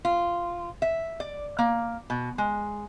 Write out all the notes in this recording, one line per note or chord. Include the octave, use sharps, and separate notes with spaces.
F4
E5
D5
A#3
B2
G#3